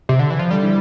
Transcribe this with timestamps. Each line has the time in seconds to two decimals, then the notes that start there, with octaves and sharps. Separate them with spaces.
0.09 C3
0.19 D3
0.30 E3
0.39 F3
0.50 D3 G3
0.63 E3